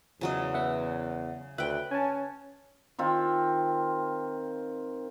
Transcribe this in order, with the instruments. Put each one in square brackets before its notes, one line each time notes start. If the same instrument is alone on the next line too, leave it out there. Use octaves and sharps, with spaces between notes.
[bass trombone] E2 [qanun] C#3 F#3 D#5
[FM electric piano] B3 E5 F#5
[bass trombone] D2 [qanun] B4 G5 [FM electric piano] E5 F#6
[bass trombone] C#4 [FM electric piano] G#5 A5
[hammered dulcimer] D#3 C4 F4